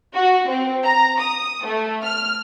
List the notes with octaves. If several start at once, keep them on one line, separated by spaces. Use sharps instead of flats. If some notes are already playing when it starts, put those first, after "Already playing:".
F#4
C4
A#5
D#6
A3
F6